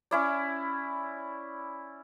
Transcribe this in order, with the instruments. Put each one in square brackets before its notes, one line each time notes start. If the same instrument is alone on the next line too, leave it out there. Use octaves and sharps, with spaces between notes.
[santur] C#4 E4 D5